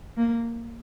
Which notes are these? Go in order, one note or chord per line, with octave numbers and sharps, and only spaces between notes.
A#3